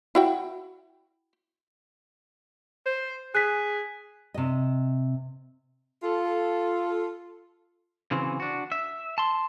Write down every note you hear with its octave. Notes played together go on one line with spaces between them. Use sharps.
E4 F#4 G5
C5
G#4 F#6 B6
C3 D#5
F4 A4
C#3 E3 F#3 C4
D4 F#4
E5
A5 C6